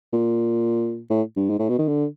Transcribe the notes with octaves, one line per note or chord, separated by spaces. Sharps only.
A#2
A2
G2
G#2
A2
B2
D#3
D3